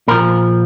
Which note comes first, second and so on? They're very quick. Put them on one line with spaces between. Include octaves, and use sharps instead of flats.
A#2 A#4 F3